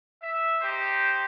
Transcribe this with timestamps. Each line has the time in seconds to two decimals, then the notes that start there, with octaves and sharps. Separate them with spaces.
0.22 E5
0.61 D#4 G4 C5